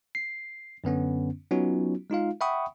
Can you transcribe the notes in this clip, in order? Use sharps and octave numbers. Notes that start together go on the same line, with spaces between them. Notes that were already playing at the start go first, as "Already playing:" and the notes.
C7
F#2 D3 B3 C#4
F#3 B3 C#4 D#4 F4 F#4
G#3 D#4 F4 F5
E5 F#5 G5 B5 C#6 D#6